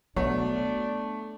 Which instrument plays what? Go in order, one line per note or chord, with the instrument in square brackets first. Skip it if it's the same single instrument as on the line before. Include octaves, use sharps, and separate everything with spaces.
[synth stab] B2 F#3 [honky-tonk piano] A3 [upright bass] B3 [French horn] D4